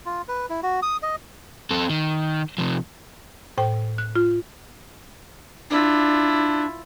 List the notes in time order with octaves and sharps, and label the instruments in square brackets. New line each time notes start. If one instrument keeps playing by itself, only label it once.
[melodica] F4
B4
E4
F#4
D#6
D#5
[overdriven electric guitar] C4 A4
D#3
C3 F3
[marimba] A2 C5 G5
F#6
F4
[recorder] D4 [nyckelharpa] E4 F4